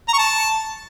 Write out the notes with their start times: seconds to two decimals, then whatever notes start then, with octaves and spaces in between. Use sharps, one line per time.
0.08 A#5
0.13 C#6
0.19 A5